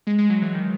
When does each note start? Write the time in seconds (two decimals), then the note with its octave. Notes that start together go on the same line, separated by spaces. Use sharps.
0.07 G#3
0.18 G#3
0.30 F#3
0.42 E3
0.54 D#3